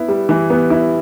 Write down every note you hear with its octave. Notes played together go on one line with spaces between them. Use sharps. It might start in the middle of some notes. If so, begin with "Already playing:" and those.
Already playing: B3 E4
G3
E3
B3
E4